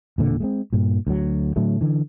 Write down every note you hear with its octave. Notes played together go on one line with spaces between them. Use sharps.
E1 A#2 D3
G#3 A3 C4
G2 A#2
D2 F#3
A2 D3 F#3 A3
D3 E3